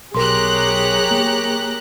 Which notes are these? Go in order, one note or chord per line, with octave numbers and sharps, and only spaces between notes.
B1 G4 G#4 A#4 C#5 A#5 C6 F#6
A#3